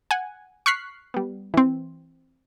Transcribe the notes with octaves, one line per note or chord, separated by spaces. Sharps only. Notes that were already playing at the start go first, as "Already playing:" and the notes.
F#5 G#5
C#6 F6 F#6 B6 C7
G3 B3
E3 C4